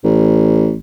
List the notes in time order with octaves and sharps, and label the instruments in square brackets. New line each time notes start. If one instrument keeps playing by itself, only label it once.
[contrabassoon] A1